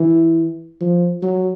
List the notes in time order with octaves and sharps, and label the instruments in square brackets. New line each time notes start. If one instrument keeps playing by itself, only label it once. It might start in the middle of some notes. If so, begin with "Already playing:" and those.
Already playing: [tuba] E3
F3
F#3